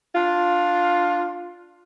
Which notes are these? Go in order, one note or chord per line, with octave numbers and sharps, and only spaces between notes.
D4 F4